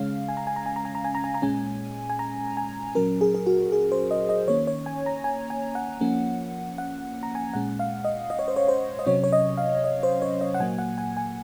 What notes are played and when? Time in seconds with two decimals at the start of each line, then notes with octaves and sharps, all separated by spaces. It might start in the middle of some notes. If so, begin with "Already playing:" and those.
Already playing: C#3 G#3 C#4 F5
0.29 G#5
0.37 A#5
0.47 G#5
0.56 A#5
0.66 G#5
0.76 A#5
0.85 G#5
0.95 A#5
1.04 G#5
1.15 A#5
1.24 G#5
1.34 A#5
1.42 A#2 G#3 C#4 G#5
2.10 G#5
2.19 A#5
2.57 G#5
2.95 A#2 F#3 C#4 A#4
3.21 G#4
3.35 G#4
3.47 F#4
3.72 G#4
3.92 C5
4.11 D#5
4.29 D#5
4.48 D#3 A#3 C#4 C#5
4.67 C#5
4.86 G#5
5.06 A#5
5.24 G#5
5.50 G#5
5.75 F#5
6.01 F3 A#3 C#4
6.78 F#5
7.23 A#5
7.35 G#5
7.54 A#2 G#3 C#4 F#5
7.79 F5
8.05 D#5
8.30 D#5
8.39 C#5
8.48 C5
8.56 C#5
8.68 C5
8.99 D#5
9.06 C3 F#3 C#4 C#5
9.24 C#5
9.33 D#5
9.58 F5
9.84 D#5
10.03 C5
10.22 C#5
10.41 D#5
10.54 F#5
10.59 A#2 F#3 A#3 G#5
10.78 F#5
10.98 G#5
11.17 G#5